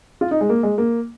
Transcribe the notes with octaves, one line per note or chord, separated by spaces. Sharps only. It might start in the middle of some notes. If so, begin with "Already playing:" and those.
F4
D#4
G#3
A#3
G#3
A#3